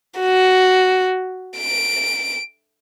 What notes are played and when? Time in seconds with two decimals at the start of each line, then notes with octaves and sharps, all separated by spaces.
0.20 F#4
1.59 D7